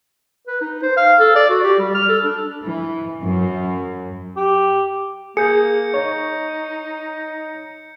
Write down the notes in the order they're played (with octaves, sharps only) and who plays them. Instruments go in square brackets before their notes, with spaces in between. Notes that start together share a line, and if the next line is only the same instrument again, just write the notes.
[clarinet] B4
D#4
C5
F5
A4
D5
F#4
G4
G3
F6
A4
D4
[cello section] E3
F#2
[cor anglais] G4
[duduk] A#3 [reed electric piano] G#4 [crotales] G6 C#7
[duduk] D#4 [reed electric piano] C#5